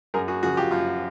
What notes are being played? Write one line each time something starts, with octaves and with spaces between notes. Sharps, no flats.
F#2 G#4 A#4
F#4 G#4
C#3 F3 F#4 G#4
F4 G4
F#2 F4